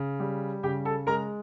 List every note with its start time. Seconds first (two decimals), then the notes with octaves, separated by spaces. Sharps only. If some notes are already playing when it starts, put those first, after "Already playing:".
Already playing: C#3
0.20 G3
0.63 C#3 G4 G5
0.85 A4 A5
1.07 G#3 A#4 A#5